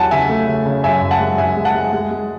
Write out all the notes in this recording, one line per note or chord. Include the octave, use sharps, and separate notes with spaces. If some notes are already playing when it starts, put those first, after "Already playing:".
Already playing: E2 F#3 F#5 G#5 A5
C#3 E5 G#5
A3
C#3
C#3
F#2 E5 G#5
F#2
F#5 A5
G#3
F#2 E5 G#5
G#3
F#5 A5
G#3
G#3
G#3